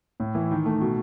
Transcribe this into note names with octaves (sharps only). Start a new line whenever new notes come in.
A2
E3
D#3
A3
B2